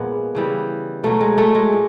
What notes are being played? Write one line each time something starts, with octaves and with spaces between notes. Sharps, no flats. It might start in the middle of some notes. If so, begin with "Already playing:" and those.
Already playing: A#2 F3 G#3 B3
C#3 E3 G3
B2 F#3 A3
G#3
A3
G#3
A#2